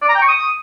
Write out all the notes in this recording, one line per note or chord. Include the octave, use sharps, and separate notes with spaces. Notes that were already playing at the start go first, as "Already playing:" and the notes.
D5
A#5
G5
C#6
D#6